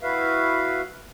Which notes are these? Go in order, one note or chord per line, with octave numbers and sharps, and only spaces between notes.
E4 F#4 B4 E5 F5